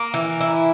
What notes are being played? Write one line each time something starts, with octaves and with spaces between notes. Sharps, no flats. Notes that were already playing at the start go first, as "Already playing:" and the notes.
Already playing: A#3
E3
E4